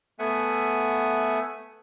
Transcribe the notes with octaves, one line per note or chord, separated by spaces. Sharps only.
A3 B3 E5 F#5 G#5